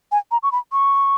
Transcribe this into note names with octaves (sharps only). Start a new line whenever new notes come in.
G#5
A#5
C#6
B5
C#6